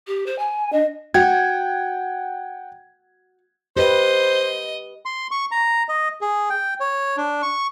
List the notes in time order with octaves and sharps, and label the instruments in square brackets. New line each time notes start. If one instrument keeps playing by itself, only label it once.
[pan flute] G4
C5
G#5
[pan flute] D4 [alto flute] D#5
[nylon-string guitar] F#4 [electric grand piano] F#5 G5 G#6
[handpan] G4 B4 [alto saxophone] C5 [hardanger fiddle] D#5
[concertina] C6
C#6
A#5
D#5
G#4
G5
C#5
D4
C#6